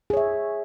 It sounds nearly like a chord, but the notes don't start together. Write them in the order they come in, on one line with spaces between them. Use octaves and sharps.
G#4 C#5 E5